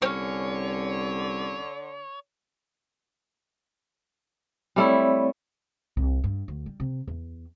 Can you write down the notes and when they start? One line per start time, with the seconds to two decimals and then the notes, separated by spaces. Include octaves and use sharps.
0.02 C2 D3 C4 C#4 C#5
4.76 G3 A3 C4 E4 C#5 D5
5.97 C2
6.24 G2
6.48 D2
6.66 G3
6.80 C3
7.07 E2